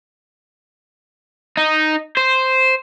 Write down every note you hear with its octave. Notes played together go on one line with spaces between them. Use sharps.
D#4
C5